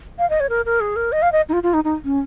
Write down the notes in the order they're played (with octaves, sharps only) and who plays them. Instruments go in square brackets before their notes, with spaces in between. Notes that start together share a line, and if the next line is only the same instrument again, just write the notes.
[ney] F5
D#5
C#5
A#4
A#4
G#4
A#4
D#5
F5
D#5
D#4
F4
F4
D#4
D#4
C#4